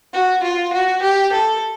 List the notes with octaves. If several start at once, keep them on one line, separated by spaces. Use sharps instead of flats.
F#4
F4
F#4
G4
A4